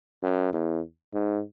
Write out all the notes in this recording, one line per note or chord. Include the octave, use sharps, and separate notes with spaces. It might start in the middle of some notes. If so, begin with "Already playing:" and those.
F#2
E2
G#2